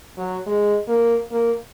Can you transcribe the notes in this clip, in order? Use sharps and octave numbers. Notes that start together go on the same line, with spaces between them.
F#3
G#3
A#3
A#3